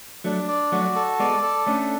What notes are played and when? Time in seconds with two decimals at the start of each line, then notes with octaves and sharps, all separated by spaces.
0.24 F#3 A3 D4
0.48 D5
0.72 F#3 A3 F#4
0.96 A4
1.20 G#3 B3 D5
1.43 A4
1.67 A3 C#4 D4